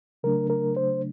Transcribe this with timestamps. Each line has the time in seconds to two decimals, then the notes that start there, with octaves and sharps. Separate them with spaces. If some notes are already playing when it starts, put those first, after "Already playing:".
0.23 C#3 F#3 A3 D4 A#4
0.50 A#4
0.77 C5